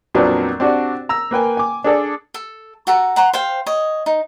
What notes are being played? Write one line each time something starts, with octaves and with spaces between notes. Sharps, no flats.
F2 A#2 F#3 B3 C4 D4
C4 D4 F#4 G4
A#5 E6
A#3 B4 G5 G#5
G#5 D6
D4 G#4 A4 D5
A4
F#4 A4 A#5
F#5 A#5 C6
C5 F5 G5
C#5 D#5
D#4